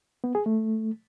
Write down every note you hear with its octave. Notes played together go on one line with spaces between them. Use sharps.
B3
G#4
A3